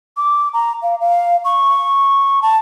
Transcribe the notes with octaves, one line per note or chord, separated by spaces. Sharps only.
D6
A#5
F5
F5
C#6
A5